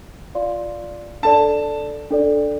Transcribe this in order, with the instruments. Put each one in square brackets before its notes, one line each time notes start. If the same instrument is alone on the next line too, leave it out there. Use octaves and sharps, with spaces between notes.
[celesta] F4 D5 F5 C6
[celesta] D4 A4 D5 [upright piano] A5
[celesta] D4 A4 D5